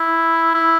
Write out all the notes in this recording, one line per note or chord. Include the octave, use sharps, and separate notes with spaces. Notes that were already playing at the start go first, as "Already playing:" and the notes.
Already playing: E4
E4